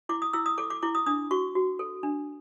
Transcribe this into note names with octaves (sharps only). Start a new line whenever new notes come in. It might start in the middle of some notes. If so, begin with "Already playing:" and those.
E4 D6
D#6
E4 E6
D#6
A4 D6
D6
E4 D6
D#6
D4 D#6
F#4 C#6
F#4
A4
D4